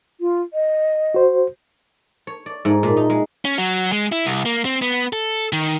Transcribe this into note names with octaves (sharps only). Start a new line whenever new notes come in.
F4
D#5
F#4 C5
C#5
D5
G#2
A#2
D#4
G#3
C#4
F#3
G#3
E4
C2
A#3
C4
B3
A4
D#3